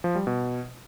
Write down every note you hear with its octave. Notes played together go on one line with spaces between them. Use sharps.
F3
G3
B2